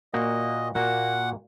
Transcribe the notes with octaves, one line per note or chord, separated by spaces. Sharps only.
A#2 A#3 F#4 D#5
A#2 A#3 F#4 F#5